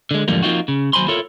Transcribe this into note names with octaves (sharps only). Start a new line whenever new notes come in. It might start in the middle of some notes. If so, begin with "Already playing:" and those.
D3 G#3
E2 G#2 D3 F3 G3 A#3
F3 A#3 C4 D#4 F4 F#4
C#3
D#2 F#3 C5 G#5 B5 C6
E4 F4 A4 A#4 C#5